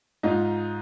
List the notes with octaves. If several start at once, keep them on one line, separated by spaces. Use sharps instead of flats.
G#2 D#4 F4